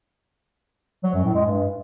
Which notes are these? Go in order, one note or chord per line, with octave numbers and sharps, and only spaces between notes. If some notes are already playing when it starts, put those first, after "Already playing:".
F#3
F#2
A2
G#3
G2